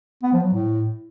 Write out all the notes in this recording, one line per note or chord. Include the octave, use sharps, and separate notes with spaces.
B3
F3
F#3
A2